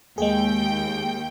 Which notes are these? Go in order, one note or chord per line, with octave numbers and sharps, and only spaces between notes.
D#2 G#3 G#4 G5